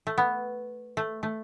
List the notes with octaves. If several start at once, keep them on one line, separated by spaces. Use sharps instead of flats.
A3
B3
A3
A3